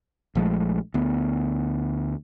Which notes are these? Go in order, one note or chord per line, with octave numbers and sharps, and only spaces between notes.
A#1 F3 G#3 A3
D2 B3